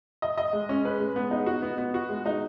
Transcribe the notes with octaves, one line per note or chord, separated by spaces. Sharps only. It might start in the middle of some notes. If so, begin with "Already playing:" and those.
D#5
D#5
G#3
C#4
B4
G#3
B3
D#4
F#4
B3
B3
F#4
G#3
D#4